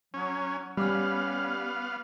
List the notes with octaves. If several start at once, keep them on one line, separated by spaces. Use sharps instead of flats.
F#3 C#4
G3 B3 C#4 F5 B5 D6 F6